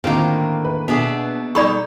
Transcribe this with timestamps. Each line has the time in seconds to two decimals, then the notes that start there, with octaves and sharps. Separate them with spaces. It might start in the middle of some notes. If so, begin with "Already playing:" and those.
0.04 A2 D3 D#3 A#3 C4 F4 D6
0.65 B4
0.88 B2 B3 D4 G#4 E5
1.55 G3 D#4 A4 D5 B5 C#6